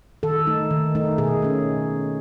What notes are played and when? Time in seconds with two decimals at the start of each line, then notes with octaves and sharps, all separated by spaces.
0.23 D#3 A4
0.47 A3 D#4
0.71 D#3
0.95 A3 D#4
1.18 B2 G#4
1.42 A3 C#4